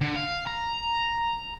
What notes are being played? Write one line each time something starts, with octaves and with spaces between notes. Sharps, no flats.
D3
F5
A#5